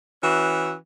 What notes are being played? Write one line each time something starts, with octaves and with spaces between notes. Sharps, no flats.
E3 C#4 F#4 E5